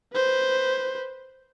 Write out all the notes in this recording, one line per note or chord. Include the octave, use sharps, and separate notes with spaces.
B4 C5